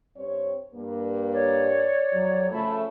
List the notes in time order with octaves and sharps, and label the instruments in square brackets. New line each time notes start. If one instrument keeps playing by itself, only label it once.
[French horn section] G2 C4 C#5
G2 A#3
[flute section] C#5 D5
[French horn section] F2 F#3
[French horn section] C#3 F3 A3 [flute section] E5 A5 B5